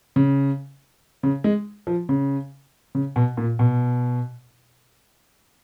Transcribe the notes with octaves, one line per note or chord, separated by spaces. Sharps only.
C#3
C#3
G#3
F3
C#3
C#3
B2
A#2
B2